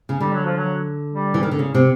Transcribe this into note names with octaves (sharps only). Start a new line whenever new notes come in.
C#3
D3 G3
F#3
F3
F#3
G3
E3
D#3
D3
C#3
C3